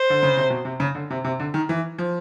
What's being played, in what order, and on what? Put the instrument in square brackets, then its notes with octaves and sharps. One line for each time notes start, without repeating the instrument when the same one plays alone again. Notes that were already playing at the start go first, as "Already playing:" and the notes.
Already playing: [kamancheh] C5
[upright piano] D3
C#3
C3
B2
C3
C#3
D3
C3
C3
D3
D#3
E3
F3